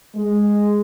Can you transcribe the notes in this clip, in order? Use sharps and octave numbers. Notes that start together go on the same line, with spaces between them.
G#3